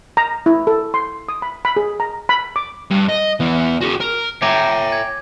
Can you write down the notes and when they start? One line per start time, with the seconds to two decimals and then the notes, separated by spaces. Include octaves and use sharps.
0.17 A#5
0.46 E4
0.67 A4
0.94 C6
1.29 D#6
1.42 B5
1.65 B5
1.76 G#4
2.00 A#5
2.29 B5
2.56 D6
2.91 G2
3.09 D#5
3.40 E3 B3
3.81 F#4 G#4
4.00 A#4
4.42 C#5 E5 G5 G#5 A#5 D6
4.92 G#6